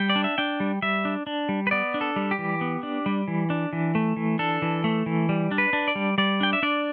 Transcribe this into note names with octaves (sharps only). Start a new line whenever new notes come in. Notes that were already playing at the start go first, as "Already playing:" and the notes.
Already playing: G3 G5
D5
D4
E5
D4 G5
G3
G3 E5
D4
D4
G3
B4
B3 D5
D4
A4
G3
G4
E3
B3
D4
G3
E3
D4
E3
A3
E3
D4 A4
E3
A3
E3
G3
D4
B4
D4
D5
G3
G3 D5
D4 G5
E5
D4 D5